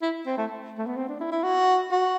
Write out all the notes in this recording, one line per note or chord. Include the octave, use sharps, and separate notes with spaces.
E4
C4
A3
A3
B3
C4
D4
E4
E4
F#4
F#4